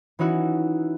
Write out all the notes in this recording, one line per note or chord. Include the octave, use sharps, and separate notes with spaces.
E3 C#4 D#4 E4 F#4